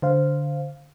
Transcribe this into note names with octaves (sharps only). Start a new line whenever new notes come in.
D3 C5 F5